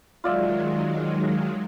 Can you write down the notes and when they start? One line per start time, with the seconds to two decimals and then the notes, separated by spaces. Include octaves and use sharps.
0.24 D#3 F#3 G#3 F4 D5 E5